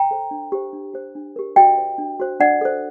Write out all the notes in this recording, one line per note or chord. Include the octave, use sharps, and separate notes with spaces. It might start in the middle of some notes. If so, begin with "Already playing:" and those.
Already playing: G5 A#5
A4 C5
D4
G4 C5
D4
G4 C5
D4
G4 A#4
F#4 D#5 G5
C5
D4
F#4 C5
D4 D5 F#5
A4 C5